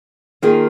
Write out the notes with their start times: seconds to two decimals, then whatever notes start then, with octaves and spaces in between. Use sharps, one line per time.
0.42 D#3 A#3 F4 G#4